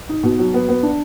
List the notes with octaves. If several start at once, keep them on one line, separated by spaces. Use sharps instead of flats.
D#4
B2
F#3
B3
B3
D4